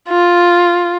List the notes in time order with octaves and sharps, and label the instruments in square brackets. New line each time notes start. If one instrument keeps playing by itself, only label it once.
[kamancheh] F4